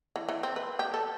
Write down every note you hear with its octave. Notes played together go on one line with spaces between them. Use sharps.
E3
E3
C4
B4
G4
A4